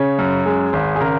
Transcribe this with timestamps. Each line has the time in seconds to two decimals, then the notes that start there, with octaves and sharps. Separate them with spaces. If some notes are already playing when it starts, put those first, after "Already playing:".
Already playing: C#3 C#5
0.19 F#2
0.46 G#3
0.73 G#1
0.96 G#4
1.01 C#3 A#4